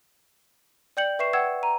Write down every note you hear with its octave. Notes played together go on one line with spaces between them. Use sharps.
D5 G5 G6 C#7 F#7
B4 E5 C#6 C7 E7
F#5 G5 E6 G#6 E7
A#5 D#7